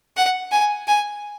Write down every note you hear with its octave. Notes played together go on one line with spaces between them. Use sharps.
F#5
G#5
G#5